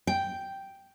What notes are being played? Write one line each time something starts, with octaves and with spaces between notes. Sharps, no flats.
G5